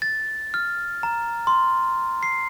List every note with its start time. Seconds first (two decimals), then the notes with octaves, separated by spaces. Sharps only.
0.02 A6
0.54 F6
1.03 A#5
1.47 C6
2.23 C7